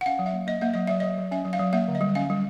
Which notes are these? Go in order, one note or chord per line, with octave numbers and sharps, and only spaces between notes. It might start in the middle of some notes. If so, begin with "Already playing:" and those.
F#5
C#4 F5
F#3
E5
A#3
A#3 D#5
A#3 E5
F#3 D#5
F#3 E5
F#3 D#5
F#3
C#4 E5
F#3
F5
F#3
A#3 E5
D3
D#5
G3
C#4 F5
G3